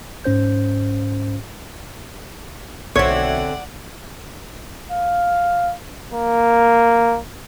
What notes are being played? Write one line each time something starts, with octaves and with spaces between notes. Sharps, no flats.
G#2 C#4 C5 G6
B1 D3 C4 C#5 D5 E5 F#5 G#6
F5
A#3